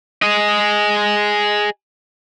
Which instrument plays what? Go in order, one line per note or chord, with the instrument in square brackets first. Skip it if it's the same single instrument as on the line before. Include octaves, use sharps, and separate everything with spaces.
[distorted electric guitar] G#4 D#5